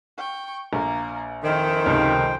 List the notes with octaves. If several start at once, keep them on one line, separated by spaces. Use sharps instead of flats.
G5 C#6
A#1 A#3 A#4
F2 D#3 E4 C5 G5
C#2 C3